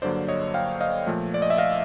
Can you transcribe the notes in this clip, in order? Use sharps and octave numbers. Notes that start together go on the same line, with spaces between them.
G2 D3 F#3 A#3 C5 D5
C#5 D#5
F5 G5
D#5 F5
A#2 F3 A3
D5
D#5
E5
D#5 F5